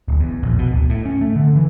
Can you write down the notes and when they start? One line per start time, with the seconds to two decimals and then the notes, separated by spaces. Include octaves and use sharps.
0.08 D1
0.20 E2
0.43 A#1
0.59 B2
0.72 D1
0.90 A2
1.06 C#4
1.21 A3
1.36 D3
1.56 E3